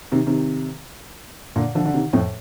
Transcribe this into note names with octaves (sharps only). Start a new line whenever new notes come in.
C3 D#3
C3 D#3
A#2 D3
D3 F3
D3
C3 D#3
F2 A2